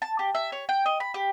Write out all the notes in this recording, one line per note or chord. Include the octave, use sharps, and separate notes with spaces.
A5
G4
E5
C#5
G5
D#5
B5
G4